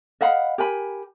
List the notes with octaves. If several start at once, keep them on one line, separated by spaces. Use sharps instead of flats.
D#5 F5 F#5 B5
G4 A#4 G#5 B5